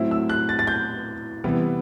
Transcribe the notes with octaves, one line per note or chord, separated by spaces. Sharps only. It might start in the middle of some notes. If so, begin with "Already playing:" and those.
Already playing: A2 F#3 C4 E4
E6
F#6
A6
A6
G6
C3 E3 G3 B3